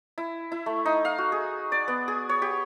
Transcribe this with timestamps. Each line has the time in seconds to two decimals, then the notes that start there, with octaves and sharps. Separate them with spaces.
0.18 E4
0.52 E4
0.66 A3
0.86 D#4
1.05 F5
1.18 F#4
1.32 G#4
1.72 D5
1.88 B3
2.08 G#4
2.29 C#5
2.42 G4